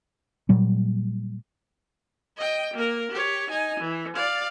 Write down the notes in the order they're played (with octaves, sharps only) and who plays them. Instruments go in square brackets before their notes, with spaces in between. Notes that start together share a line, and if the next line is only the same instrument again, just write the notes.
[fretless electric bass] A#2 F#3 G3
[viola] D#5 G5
A#3 A#4
G4 C#5
D#4 G#5
E3
D5 F5